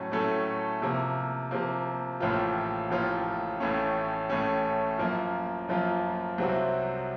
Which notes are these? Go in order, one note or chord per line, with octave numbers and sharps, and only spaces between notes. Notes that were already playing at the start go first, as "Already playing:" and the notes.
Already playing: A2 F#3 A3 C#4
A2 F#3 A3 C#4 A4
C3 F3 A#3
C3 F3 A#3
A1 A2 F3 A#3 F4
A1 A2 F3 A#3 F4
A1 A2 A3 C#4
A1 A2 A3 C#4
F#2 F3 A#3 F4
F#2 F3 A#3 F4
C2 C3 F#3 C4 F#4